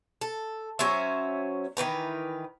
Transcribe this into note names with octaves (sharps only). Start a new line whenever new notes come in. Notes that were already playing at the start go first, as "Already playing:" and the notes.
A4
F#3 C#4 C5 E5
D#3 E3 B4 A#5